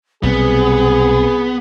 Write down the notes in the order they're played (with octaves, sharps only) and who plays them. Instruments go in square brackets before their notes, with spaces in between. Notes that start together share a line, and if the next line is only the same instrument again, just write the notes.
[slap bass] B1 C3 G3 [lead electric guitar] B3 [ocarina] C4 [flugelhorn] G#4